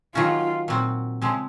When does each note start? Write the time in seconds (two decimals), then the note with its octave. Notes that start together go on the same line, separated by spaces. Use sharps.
0.15 D#3 F#3 C#4 F4 F#4
0.68 A#2 F#3 C4 F#4
1.22 C#3 F3 G#3 C4